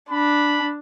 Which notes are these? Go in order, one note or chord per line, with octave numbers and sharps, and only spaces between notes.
D4 B5